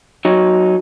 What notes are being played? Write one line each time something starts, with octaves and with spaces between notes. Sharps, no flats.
F#3 D#4